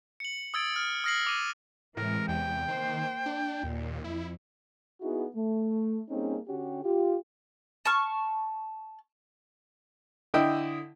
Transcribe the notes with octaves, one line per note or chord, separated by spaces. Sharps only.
C#7 F#7
D#6 E6 G#6 A6 D7
F6
D#6 F6 A#6 C7 F#7
D6 D#7
A2 C3 E3 G#3 A#4
E2 G5
D#3 A#3 C5
D4
D#2 A#2
F2 E4
B3 D#4 E4 F#4 G#4
A3
G3 A#3 C4 C#4 D#4 G#4
D3 C#4 F#4 G4
F4 G4
A5 C#6 F6
D3 E4 D#5 G5 D#6